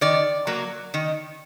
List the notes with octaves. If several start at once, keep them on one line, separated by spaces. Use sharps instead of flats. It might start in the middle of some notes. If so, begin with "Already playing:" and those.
D#3 D5
F#3 A#3
D#3